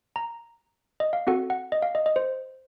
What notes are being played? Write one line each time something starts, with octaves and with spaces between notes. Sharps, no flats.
A#5
D#5
F5
C4 F#4 A4 F#5
F#5
D#5
F5
D#5
D#5
C5